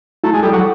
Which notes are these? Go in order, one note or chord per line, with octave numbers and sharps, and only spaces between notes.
A3 E4
G#3
G3 A4
F#3